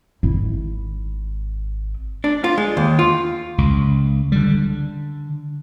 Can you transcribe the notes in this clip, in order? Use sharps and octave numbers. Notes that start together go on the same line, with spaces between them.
G#1 E4
D4
F4
G#3
D#2
F4
C#2
D3 G3
D3